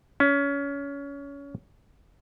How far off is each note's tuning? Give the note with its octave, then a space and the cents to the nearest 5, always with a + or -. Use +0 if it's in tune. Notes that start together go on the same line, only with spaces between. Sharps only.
C#4 +25